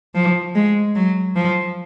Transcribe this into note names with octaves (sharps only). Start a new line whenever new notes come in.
F3
G#3
F#3
F3